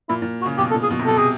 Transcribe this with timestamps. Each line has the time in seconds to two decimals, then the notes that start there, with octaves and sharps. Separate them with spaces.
0.09 A#2 E4
0.22 A#2
0.42 F#4
0.46 C#3
0.57 B2 G4
0.71 A4
0.74 A#2
0.83 G#4
0.90 B2
0.99 C3
1.05 B2 A4
1.16 C3 G#4